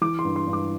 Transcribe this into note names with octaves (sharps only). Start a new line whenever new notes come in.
E3 D6
C6
G2
C6
G2
D6